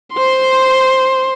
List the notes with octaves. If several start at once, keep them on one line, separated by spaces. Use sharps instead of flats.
C5 C6